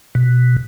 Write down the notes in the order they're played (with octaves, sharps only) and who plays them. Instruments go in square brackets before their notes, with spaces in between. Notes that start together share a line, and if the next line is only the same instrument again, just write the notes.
[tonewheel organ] B2